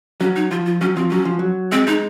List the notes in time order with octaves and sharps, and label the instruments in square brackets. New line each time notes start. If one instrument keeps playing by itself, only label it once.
[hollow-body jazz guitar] F#3 [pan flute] C#4
[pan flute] D#4
[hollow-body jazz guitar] F3 [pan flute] F4
[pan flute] F4
[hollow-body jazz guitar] F#3 [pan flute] C#4
[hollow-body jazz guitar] F3 [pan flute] C4
[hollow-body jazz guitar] F#3 [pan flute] C#4
[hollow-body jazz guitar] F3
F#3
[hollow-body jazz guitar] G#3 [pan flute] C4
[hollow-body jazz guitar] G#3 [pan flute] D#4